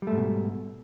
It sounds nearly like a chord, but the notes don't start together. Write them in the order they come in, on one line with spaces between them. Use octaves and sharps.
G3 A3 G#2 B2